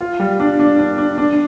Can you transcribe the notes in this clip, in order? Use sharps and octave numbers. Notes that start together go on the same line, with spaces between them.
F4
G3
D4
D4
D4
D4
D4